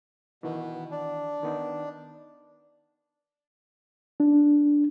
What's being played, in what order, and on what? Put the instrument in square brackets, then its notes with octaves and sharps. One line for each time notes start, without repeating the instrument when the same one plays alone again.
[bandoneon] B2 [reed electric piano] D#3 E3
[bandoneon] D4
[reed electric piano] D#3 B3 D#4
D4